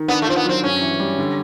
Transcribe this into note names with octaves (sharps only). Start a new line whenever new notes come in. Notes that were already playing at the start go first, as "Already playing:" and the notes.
Already playing: D#3
B3 D4
A3
C4 F4
B3
F#3 C4
G2 C#4
E3
G3
D3